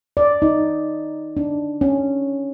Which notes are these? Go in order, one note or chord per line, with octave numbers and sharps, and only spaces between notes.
D5
D#4
D4
C#4